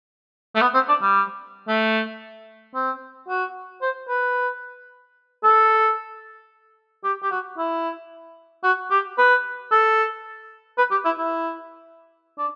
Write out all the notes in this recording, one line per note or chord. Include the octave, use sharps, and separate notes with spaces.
A3
B3
C4
D4
G3
A3
C4
F#4
C5
B4
A4
G4
G4
F#4
E4
F#4
G4
B4
A4
B4
G4
E4
E4
D4